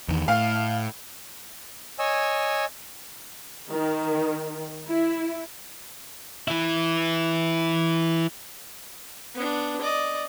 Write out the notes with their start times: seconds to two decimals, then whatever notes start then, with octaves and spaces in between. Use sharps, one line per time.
0.08 E2 D#3
0.28 A2 F5
1.99 C#5 D#5 G#5 E6
3.70 D#3
4.87 E4
6.48 E3 E4
9.35 B3 D4
9.81 D5 D#5